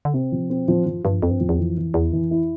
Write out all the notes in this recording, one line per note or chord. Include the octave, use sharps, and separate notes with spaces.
D3
C3 C4
F3
B2 C4
A2 F3
G2 F3
G2 F3
F2 C4
G2
F2 F3
E2
F2 E3
E3
E2 E4
F2 E3
E4